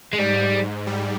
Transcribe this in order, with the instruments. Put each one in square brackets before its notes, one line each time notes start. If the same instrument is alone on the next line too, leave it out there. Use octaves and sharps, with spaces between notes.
[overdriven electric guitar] G#3
[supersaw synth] G#2 [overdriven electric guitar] G3
[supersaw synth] G3